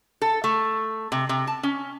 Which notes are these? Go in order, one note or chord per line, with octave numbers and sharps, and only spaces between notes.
A4
A3
C3
C3
A5
C#4